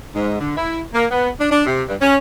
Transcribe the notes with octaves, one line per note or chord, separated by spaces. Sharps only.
G#2
D3
E4
A#3
B3
D4
D4
C3
G2
C#4